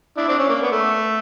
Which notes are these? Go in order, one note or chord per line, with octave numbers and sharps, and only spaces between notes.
D4 E4
C4 D4
C#4
A#3
B3
A3